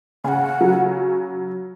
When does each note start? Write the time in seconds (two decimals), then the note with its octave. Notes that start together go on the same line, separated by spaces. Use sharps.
0.24 C#3 G#5
0.28 F#5
0.61 F#3